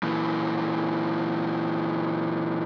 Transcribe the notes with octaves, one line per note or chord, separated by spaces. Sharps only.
A#2 E3